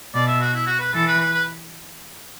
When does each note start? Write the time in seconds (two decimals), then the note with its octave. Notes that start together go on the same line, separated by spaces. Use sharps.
0.14 B2 D5
0.27 E5
0.41 F#4
0.54 E4
0.67 F#4
0.80 B4
0.94 E3 A4
1.07 B4
1.20 B4
1.33 B4